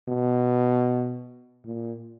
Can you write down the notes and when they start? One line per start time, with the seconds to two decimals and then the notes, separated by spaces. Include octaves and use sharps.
0.08 B2
1.65 A#2